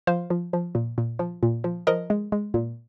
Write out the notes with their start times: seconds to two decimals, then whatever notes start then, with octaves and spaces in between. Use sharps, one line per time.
0.07 F3 C5 F5
0.30 F3
0.53 F3
0.75 A#2
0.98 A#2
1.19 F3
1.43 A#2
1.64 F3
1.87 F3 A#4 D#5
2.10 G#3
2.32 G#3
2.54 A#2